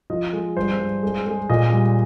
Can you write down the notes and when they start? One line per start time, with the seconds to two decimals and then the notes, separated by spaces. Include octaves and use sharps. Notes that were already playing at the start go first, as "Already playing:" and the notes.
0.10 F3 D#5
0.33 G#3
0.57 G2 C5
0.79 G2
1.03 G#3
1.26 G#3
1.49 A#2 D#5
1.73 G3